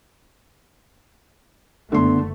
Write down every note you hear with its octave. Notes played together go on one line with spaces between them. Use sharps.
F#1 D3 A3 B3 C6